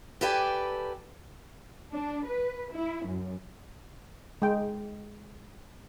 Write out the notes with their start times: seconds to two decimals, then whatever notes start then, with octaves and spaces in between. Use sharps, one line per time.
0.21 G4 A4 B4 D5 G5 G#5
1.93 D4
2.26 B4
2.73 E4
3.07 F#2
4.42 G#3 G5